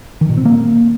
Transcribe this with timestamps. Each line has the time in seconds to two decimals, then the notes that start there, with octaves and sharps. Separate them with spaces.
0.21 D#3
0.29 A#2
0.37 C4
0.45 A#3